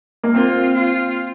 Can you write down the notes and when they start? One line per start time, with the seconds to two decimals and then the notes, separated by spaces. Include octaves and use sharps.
0.23 A#3
0.34 C4 F4
0.74 F4